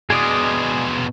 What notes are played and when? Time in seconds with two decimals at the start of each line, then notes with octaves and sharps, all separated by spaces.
0.10 B2 G#3 G#4 D5 D#6